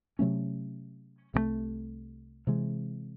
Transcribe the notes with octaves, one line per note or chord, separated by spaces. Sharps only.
C3 F#3 A3 C#4
C2 C3 D#3 A3
C3 E3 G#3